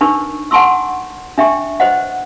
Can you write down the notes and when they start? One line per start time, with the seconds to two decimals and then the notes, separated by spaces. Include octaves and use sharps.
0.01 D4 D#4 A#4 B4 C#6
0.51 F#5 G#5 A5 C6 C#6 E6
1.38 D4 E5 G5 C#6
1.80 B4 C5 D#5 F#5